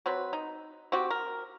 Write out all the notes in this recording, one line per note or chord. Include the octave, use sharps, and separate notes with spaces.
F#3 C4 B4
D#4
C4 F#4 G4
A#4